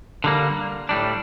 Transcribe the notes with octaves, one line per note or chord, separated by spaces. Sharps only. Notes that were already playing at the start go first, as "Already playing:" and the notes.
D3 G3 A#3
A2 G3 D4